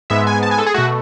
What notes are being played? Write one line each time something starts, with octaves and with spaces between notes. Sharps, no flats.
G#2 G#3 B3 E5
G#5
A5
G#5
A4
G#4
B2 A3 F#4